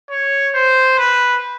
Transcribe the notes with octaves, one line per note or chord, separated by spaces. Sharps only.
C#5
C5
B4